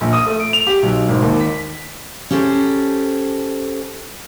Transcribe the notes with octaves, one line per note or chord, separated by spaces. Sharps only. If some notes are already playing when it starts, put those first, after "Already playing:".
A#1
D#6
A3
D7
F7
G4
B1
G#1
D#2
B6
C#4 G4 A4 C5